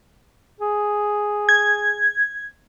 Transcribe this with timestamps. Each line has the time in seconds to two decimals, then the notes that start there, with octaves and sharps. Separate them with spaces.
0.60 G#4
1.49 G#6